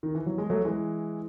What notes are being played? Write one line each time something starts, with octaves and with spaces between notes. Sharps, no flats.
D#3
E3
F#3
G#3
F#3 A3
E3 G#3